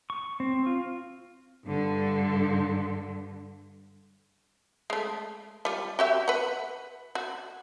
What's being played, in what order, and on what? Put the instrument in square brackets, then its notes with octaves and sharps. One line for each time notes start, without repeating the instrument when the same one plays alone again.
[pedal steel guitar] C#6
C4
F4
[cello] G2 D3
[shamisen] G#3 A3
G3 F4
F#4 G4 E5
B4 F#5
F#4